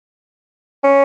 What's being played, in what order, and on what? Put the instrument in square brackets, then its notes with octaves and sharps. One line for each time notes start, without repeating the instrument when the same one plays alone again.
[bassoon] C#4